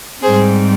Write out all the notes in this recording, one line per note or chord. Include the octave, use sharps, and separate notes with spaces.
G#2 G3 C4 G#4 C5